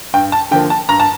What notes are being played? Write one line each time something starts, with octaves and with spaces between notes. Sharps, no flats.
G2 G5
A5
D3 F3 A#3 G5
A5
G2 A#5
A5